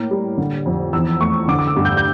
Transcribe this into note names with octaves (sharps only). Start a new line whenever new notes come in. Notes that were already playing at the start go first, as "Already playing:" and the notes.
Already playing: A2 A#3
G3
D3
F2
E2 E6
A3 C#6
D3 D6
D6
E6
G2
G6
G6